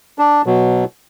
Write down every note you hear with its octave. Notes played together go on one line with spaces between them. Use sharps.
D4
B2 F#3